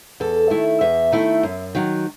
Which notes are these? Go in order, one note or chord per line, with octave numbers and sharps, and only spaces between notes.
E2 A4
D#3 A3 E4
E2 E5
D#3 A3 E4
F#2
D#3 F#3